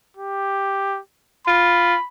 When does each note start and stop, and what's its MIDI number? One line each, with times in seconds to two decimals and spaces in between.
0.17 1.00 67
1.48 1.95 65
1.48 2.07 83